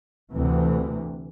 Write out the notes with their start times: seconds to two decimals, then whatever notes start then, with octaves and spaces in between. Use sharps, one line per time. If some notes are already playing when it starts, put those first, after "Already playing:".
0.34 D2 C3 E3